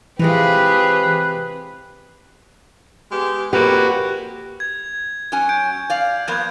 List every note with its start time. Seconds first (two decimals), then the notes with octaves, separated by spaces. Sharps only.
0.19 C3 E3 G#3 F4 G4 G#4 B4
3.10 G#3 B3 G4
3.53 F2 A#2 A#3 F#4 G4 B4
4.60 G#6
5.32 F#3 C#4 G#5
5.49 G6 D7
5.90 D5 F5
6.28 F3 A#3 B3 G6 G#6